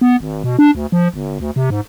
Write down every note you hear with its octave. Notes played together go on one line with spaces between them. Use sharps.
B3
G#1
B2
D4
D2
F3
G1
D2
C3
G#2